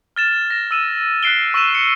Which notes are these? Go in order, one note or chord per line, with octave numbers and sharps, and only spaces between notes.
F6 A6 E7
A#6 E7
E6 D#7 E7
F#6 B6 C7 D7 G7
C#6 E6 B6 D#7 E7
C#7